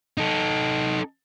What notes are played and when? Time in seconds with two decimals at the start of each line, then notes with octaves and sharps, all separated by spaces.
0.18 D#4 A4